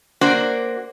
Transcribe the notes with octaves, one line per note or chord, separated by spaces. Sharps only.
A#3 D4 F#4 C5